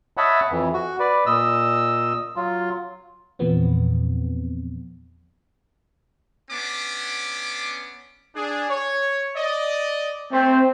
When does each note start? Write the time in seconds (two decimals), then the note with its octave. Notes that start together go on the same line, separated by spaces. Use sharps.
0.17 C#5 D#5 E5 F#5 A5 B5
0.51 F2 E3
0.74 F#4
0.99 B4 D5
1.26 A#2 D#5 E6
2.36 F#3 F4
3.39 E2 A#2 F3 B3 C4
6.49 B3 C#4 D4 D6
8.36 D4 G#4
8.69 C#5
9.36 D5 D#5
10.32 A3 C4